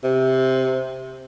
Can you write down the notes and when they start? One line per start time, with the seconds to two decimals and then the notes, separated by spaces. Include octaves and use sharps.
0.04 C3